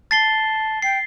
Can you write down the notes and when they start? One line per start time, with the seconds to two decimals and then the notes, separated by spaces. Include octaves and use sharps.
0.11 A5 A6 C7 G7
0.82 G5 C7